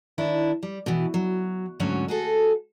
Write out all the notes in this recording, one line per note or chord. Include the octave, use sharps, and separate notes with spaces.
D#3 D4 E4
G3
B2 E3
F#3
D2 G#2 D3 F#3 C#4
F#4 G#4 A4